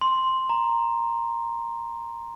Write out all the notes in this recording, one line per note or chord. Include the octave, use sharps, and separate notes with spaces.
C6
A#5